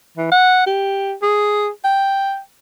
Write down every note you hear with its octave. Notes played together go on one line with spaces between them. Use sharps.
E3
F#5
G4
G#4
G5